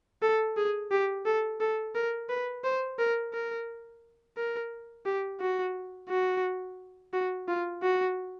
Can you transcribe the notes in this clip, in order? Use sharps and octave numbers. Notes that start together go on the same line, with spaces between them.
A4
G#4
G4
A4
A4
A#4
B4
C5
A#4
A#4
A#4
G4
F#4
F#4
F#4
F4
F#4